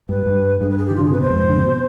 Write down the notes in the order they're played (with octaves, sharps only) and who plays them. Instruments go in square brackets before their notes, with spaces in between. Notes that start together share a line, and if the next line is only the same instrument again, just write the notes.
[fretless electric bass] G2 [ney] B4
[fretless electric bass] G2
[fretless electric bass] G2 [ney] G#4
[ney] B4
G#4
G4
[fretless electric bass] D#3
[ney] F4
[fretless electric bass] D3 [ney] G#4
[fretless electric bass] C3 [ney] B4
[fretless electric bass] B2 [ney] C5
[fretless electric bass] F2 G#2
D3
C3
B2